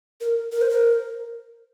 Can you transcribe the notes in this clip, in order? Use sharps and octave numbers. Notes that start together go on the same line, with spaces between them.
A#4
A#4
C5
A#4